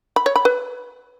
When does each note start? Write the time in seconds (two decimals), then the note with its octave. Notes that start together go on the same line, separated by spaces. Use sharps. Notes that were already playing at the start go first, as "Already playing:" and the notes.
0.16 B5
0.26 C#5
0.36 B5
0.45 B4